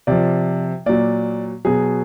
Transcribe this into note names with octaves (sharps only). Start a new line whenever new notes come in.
C3 F3 D5
A#2 F#3 D5
B2 F#3 G#4